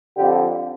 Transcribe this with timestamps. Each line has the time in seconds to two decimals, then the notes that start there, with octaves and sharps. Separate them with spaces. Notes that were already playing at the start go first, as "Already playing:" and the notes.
0.17 F2 D3 G4